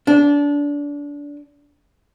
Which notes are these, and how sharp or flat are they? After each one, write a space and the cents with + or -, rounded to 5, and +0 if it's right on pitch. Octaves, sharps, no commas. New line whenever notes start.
D4 -25